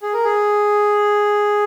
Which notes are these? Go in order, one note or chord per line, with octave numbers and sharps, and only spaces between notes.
G#4
A#4
G#4